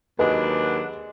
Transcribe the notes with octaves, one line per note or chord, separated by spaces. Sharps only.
D#2 F#3 G#3 D4 B4 D5 F#5